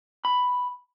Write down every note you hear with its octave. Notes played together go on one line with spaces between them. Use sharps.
B5